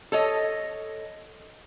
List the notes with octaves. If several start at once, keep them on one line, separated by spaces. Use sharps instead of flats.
A4 C#5 D#5